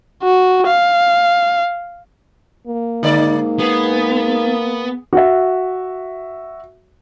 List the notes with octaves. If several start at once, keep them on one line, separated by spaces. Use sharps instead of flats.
F#4
F5
A#3
G#2 D3 D#4 D5
B3 G#4
F#4 E5